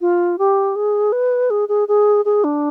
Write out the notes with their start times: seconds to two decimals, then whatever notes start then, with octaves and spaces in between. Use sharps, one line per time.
0.01 F4
0.38 G4
0.76 G#4
1.12 B4
1.50 G#4
1.69 G#4
1.88 G#4
2.25 G#4
2.44 D4